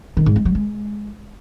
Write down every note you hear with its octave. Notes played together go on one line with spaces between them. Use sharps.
D#3
G#2
G#3
F#3
G#3